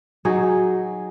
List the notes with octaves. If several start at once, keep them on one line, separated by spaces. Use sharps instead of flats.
F#3 D#4 G#4